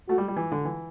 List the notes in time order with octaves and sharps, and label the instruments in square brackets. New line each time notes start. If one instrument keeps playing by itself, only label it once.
[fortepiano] A3 [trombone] F#4
[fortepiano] G3
G3
E3
D3
E3